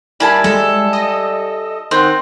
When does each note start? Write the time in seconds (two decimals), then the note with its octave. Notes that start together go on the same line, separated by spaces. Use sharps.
0.20 G3 A#3 E4 G#5 A5 B5
0.44 G#3 A4
0.93 D#5
1.91 D#3 C4 C5 F#5